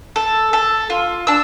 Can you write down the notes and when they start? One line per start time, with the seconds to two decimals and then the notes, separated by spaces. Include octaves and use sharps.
0.16 A4
0.53 A4
0.90 F4
1.27 D4 E6